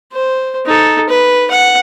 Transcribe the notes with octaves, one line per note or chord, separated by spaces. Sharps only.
C5
D#4 A4
B4
F#5